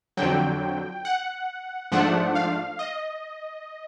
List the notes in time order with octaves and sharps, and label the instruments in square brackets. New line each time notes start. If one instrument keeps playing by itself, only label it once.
[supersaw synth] F2 D3 F#3 G5
F#5
G#2 F3 A3 D4 F#5
F5
D#5